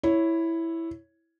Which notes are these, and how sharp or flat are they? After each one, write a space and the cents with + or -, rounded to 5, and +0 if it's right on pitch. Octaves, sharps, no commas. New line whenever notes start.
E4 +0 C#5 +0